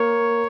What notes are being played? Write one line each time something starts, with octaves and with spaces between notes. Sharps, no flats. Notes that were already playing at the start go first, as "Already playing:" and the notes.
Already playing: A#3 C#5